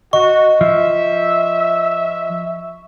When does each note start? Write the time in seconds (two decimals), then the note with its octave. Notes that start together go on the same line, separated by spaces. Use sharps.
0.13 F#4 D#5 C#6
0.61 F3 E5